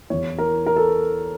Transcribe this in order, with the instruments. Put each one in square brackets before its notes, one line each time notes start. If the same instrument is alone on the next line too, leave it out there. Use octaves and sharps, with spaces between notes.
[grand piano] E2 E3 C#5
A#4
A#4
A4